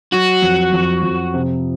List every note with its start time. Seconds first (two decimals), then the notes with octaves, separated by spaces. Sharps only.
0.12 F#3 F#4
0.42 F2
0.72 F2
1.03 F2
1.34 C3